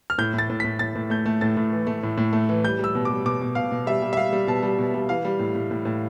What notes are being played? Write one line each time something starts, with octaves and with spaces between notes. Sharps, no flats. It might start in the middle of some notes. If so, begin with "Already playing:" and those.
F6
A2 G6
A2 A6
A2
A2 B6
A2 A6
A2
A3 G6
A3
A2 A6
A2
E3
A3
A2
A2
A3
E3
G3 G6
G3 E6
B2
G3 D6
B2 D6
B2
B2 F5
B2
G3 E5
G3
E5
G3 F5
G3
B2 A5
G3
B2
G3
E3 F5
G3
A2
A2
A2
A2